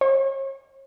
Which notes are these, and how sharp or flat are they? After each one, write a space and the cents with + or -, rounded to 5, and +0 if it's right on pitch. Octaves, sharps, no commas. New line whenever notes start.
C#5 -40